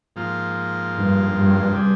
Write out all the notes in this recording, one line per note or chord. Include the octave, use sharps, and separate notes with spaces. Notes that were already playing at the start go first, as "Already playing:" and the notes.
G#2 F3 A#3 F4
G2
G2
C3 G3 D4 G#4